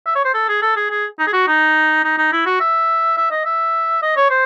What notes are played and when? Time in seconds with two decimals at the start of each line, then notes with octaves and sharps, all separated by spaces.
0.06 E5
0.15 C#5
0.25 C5
0.34 A4
0.48 G#4
0.62 A4
0.76 G#4
0.91 G#4
1.19 D#4
1.27 G#4
1.33 F#4
1.48 D#4
2.04 D#4
2.18 D#4
2.32 E4
2.46 F#4
2.60 E5
3.17 E5
3.31 D#5
3.45 E5
4.02 D#5
4.16 C#5
4.30 C5